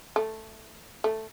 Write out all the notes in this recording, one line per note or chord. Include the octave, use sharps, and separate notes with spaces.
A3
A3